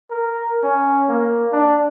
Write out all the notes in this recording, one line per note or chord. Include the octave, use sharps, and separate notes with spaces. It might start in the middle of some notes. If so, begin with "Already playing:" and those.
A#4
C#4
A#3
D4